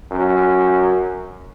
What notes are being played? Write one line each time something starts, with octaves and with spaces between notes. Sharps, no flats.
F#2